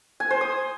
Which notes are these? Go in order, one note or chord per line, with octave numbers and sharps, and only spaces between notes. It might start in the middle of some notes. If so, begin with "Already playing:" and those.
G#5
C5
D#6